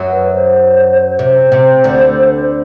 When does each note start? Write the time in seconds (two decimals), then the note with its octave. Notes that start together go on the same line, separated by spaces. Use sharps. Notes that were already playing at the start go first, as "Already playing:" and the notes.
Already playing: F#2 F#3
0.10 B4
0.32 C5
1.18 C3 C5
1.52 C3
1.84 D2 D3